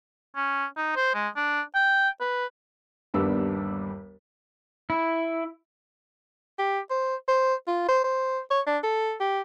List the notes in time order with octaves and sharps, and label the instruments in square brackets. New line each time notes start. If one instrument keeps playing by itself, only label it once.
[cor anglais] C#4
D#4
C5
G#3
D4
G5
B4
[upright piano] G1 D#2 G3 B3 D4 E6
[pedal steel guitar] E4
[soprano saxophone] G4
C5
C5
F4
C5
C5
C#5
D4
A4
G4